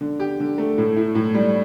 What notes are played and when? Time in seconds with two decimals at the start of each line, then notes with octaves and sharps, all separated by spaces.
0.01 D3
0.20 G4
0.40 D3
0.58 A3
0.78 A2
0.96 E4
1.15 A2
1.34 G3